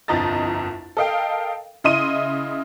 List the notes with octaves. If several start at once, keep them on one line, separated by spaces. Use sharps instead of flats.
G1 C2 F2 D#5 A#5 A6
A4 A#4 D#5 F5 G5
C#3 E4 D#5 C6 D#7